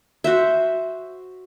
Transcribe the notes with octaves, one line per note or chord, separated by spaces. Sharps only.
F#4 C5 E5